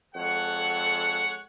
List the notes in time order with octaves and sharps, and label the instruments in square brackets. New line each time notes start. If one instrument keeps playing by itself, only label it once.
[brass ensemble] F2 G#3 A4 C#5 F#5